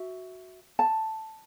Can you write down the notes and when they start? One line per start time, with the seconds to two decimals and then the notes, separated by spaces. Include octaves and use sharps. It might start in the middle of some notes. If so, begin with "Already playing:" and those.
Already playing: F#4 E5
0.79 A5